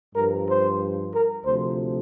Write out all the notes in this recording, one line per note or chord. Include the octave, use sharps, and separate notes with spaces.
G2 F3 A#4
C5
A#4
D2 C3 F3 C5